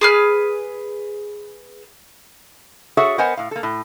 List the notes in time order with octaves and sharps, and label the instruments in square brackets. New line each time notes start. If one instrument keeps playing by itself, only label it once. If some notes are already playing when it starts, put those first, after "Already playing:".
[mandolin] G#4 B4 F6
[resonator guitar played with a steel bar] F#4 G#4 A4 C#5 E5 F#5
B3 A#4 C5 D#5 F#5 G#5
A2 F5
A#3 A4
A2